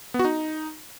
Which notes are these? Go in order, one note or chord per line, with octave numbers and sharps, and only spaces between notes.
B3
F#4
D#4